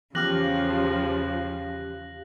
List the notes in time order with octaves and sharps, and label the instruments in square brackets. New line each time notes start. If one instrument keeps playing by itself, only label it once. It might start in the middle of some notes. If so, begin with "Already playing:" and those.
[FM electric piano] E2 G4 F5 [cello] C#3 [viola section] F3 [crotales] F#6 A#6 F#7